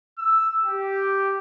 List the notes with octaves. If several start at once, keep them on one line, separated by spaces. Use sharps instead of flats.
E6
G4